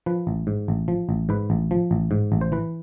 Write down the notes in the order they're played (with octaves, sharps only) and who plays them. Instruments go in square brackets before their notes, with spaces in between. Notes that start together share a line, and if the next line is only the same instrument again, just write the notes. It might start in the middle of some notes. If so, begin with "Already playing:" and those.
[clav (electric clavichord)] F3 B4
A1
G#2
A1
F3
A1
G#2 B4
A1
F3
A1
G#2
A1
C5
E3 B4